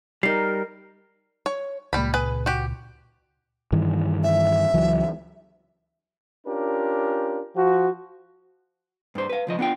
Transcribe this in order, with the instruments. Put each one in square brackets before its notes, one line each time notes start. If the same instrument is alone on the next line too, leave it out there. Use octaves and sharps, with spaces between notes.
[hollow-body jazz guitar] G3 D#4 [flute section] A#4 [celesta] C7
[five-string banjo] C#5
[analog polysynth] C#2 A#2 [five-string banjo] G3 B5
[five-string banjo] G#4 B4
F#4 G4
[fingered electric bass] G2 D#3 E3
[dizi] E5
[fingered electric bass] C#2 E3 F#3
[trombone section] C#4 D4 F4 G4 A#4
F3 F#4
[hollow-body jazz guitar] G2 C5
B4 F5
C#2 F3 D#5
B3 D4 F4 G5